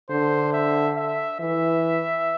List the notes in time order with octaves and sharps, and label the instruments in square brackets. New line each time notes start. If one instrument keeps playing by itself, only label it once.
[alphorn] D3 [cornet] C5
[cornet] E5
E5
[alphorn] E3 [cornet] E5